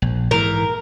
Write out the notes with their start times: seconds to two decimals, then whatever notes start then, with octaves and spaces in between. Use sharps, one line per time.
0.02 A#1
0.31 G#2 E3 A#4